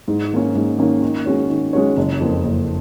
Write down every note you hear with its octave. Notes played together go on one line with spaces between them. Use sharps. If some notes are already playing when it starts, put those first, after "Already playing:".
G#2
D#3 A#3 C#4
G#2
D#3 A#3 C#4
D#3
G#3 C#4 F#4 C#5
D#3
G#3 C#4 F#4 C#5
F#1
F2 F3 A#3
F#1